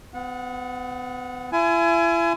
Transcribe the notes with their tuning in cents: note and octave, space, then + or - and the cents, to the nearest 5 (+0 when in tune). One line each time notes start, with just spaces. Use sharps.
B3 +35 F#5 -25
E4 +40 G#5 +20